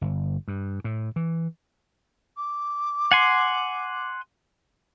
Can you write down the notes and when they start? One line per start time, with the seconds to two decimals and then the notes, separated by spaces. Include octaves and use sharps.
0.01 G1
0.48 G2
0.84 A2
1.16 E3
2.37 D6
3.12 F#5 G#5 C6